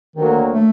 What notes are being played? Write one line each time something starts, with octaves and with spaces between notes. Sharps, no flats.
D2 D3 D#3 F#3 A#3
A3